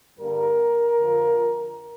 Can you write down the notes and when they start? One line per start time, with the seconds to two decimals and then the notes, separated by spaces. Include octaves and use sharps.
0.19 G2 D3 G3 A#3 A#4
0.99 F2 D3 F3